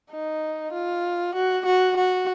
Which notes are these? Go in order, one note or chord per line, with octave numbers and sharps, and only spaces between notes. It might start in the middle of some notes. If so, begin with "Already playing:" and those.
D#4
F4
F#4
F#4
F#4